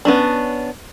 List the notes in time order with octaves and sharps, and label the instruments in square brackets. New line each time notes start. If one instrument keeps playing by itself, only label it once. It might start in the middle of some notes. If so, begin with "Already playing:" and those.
[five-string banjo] B3 C#4 D4